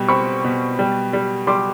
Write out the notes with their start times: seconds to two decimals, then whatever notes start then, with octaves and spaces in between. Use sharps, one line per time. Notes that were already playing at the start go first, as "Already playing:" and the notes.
Already playing: B2 G3
0.09 C4 B5 C#6
0.44 B2
0.79 G3
1.13 G3
1.47 G3 C6 D6